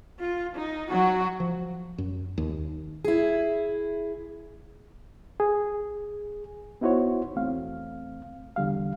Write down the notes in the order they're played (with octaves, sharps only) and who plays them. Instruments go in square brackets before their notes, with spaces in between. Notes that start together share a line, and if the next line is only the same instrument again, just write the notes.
[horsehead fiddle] F4
D#4
F#3 F#4
[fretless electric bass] F3
F#2
D#2
[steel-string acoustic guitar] E4 G#4
[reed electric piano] G#4
B3 D#4 E4 F#4 C5 C#5
E2 A3 C4 F5
E2 D3 G3 F5